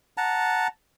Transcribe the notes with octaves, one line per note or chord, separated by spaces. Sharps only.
F#5 A5 A#5